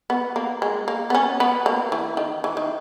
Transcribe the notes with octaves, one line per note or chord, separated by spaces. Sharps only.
B3
A#3
G#3
A#3
B3
C#4
B3
A#3
E3
D#3
E3
D#3